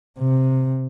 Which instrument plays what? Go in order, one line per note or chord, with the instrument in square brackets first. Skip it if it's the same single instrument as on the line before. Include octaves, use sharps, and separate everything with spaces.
[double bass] C3